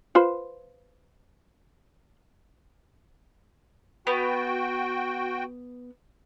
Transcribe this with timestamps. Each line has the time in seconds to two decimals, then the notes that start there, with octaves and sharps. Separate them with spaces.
0.15 F4 B4 C5
4.07 B3 F#4 G5